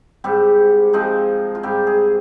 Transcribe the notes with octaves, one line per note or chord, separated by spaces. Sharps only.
G#2 G3 C4 G4
F3 G#3 C4 D#4
F4
G#2 G3 C4 G4
G#4